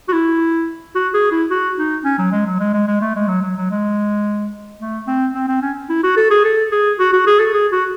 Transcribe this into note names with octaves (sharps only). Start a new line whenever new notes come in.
F#4
E4
F#4
G#4
E4
F#4
D#4
C#4
F#3
G#3
F#3
G#3
G#3
G#3
A3
G#3
F#3
F#3
F#3
G#3
A3
C4
C4
C4
C#4
E4
F#4
A4
G#4
A4
G#4
F#4
F#4
G#4
A4
G#4
F#4